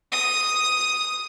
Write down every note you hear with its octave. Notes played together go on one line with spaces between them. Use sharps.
D#6